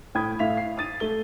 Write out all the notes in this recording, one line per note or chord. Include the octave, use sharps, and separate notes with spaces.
A2 G5 B5 D#6 G#6
A2 E5 F5 B6 F7
C7
D#6 A6 D#7
A3 G7